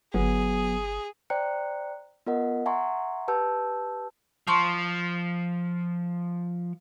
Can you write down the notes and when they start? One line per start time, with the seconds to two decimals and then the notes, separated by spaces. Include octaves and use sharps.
0.14 G1 F#3 B3 G#4
1.30 C5 D5 G5 A#5 F#6 C#7
2.26 B3 F4 A#4 D#5 F#5
2.66 E5 F#5 G#5 A#5 C6 C#6
3.28 G4 B4 A5 E6 G6
4.47 F3 A5 C6 C#6